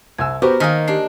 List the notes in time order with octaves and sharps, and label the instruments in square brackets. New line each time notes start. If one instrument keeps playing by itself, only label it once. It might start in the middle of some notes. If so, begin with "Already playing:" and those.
[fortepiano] C2 G#5 E6 [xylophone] G#6
[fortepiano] B3 F#4 G4 [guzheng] A#4 [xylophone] C5
[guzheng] D#3 A#3 [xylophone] F5 A#6 B6 [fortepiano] G#5 D#6 F6
[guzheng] D4 [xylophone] G4 C7